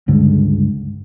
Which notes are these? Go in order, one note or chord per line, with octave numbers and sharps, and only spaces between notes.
C#2 G2 D3 G#3